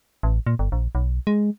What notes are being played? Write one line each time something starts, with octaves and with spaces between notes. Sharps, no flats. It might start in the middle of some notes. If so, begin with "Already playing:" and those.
A1
A#2
G1
A#1
B1
G#3